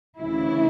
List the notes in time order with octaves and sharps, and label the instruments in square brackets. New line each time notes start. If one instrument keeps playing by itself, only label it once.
[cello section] D2 C#3 E3 E4